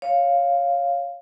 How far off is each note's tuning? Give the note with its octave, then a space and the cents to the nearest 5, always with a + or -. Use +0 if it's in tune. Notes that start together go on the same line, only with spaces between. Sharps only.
C#5 +0 F5 +0